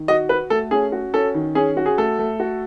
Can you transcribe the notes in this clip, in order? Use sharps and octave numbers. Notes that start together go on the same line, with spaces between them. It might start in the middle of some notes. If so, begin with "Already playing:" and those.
Already playing: D#3
F#4 D#5
F#4 B4
A3 A4
C#4 G#4
F#4
C#4 A4
D#3
C#4 G#4
F#4
G#4
A3 A4
A3
F#4